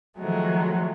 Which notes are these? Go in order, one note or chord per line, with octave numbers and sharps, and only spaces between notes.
D#3 F3 F#3 G#3 A3